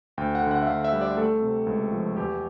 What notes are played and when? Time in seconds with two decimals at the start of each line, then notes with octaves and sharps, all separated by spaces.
0.18 D2 G5
0.35 F#5
0.43 D3
0.51 F#5
0.62 E5
0.67 D2 F5
0.84 E5
0.93 G3
1.01 D5
1.17 A3 A4
1.42 C3
1.66 C#2
1.92 F3
2.17 E2 G4